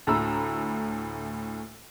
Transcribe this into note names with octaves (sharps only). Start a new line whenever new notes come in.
D2 A2 A#5 B5 E6